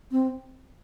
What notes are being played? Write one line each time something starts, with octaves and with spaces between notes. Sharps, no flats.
C4